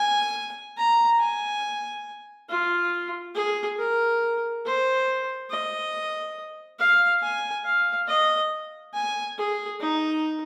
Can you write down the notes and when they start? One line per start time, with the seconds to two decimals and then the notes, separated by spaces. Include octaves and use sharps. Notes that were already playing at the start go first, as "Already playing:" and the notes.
Already playing: G#5
0.78 A#5
1.20 G#5
2.50 F4
3.35 G#4
3.79 A#4
4.65 C5
5.50 D#5
6.79 F5
7.23 G#5
7.65 F5
8.08 D#5
8.94 G#5
9.38 G#4
9.81 D#4